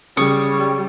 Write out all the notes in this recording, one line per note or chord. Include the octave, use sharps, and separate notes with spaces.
C#3 G3 C#5 C#6 D#6